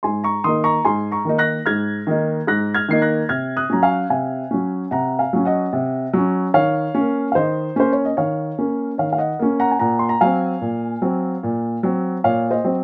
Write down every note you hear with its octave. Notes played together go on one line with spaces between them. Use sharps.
G#2 G#5 C6
A#5 C#6
D#3 A#3 D#4 C6 D#6
A#5 C#6
G#2 G#5 C6
A#5 C#6
D#3 A#3 D#4
F#6 A#6
G#2 F6 G#6
D#3 A#3 D#4
G#2 F#6 A#6
F6 G#6
D#3 A#3 D#4 C7
F#6 A#6
C3 F6 G#6
D#6 F#6
F#3 C#4 A#5
F5 G#5
C3 F5 G#5
F#3 C#4
C3 F#5 A#5
F5 G#5
F#3 C#4
D#5 F#5
C3
F#3 C#4
D#3 C#5 F5
C#4
A#3
F5
D#3 C5 D#5
A#3 C#4 C5
C#5
D#5
D#3 C#5 F5
A#3 C#4
D#3 C#5 F5
F5
D#5 F#5
A#3 C#4
F#5 A#5
G#5
A#2 F#5 A#5
C6
A#5
F#3 C4 F5 G#5
A#2
F#3 C4
A#2
F#3 C4
A#2 C#5 F5
C5 D#5
F#3 C4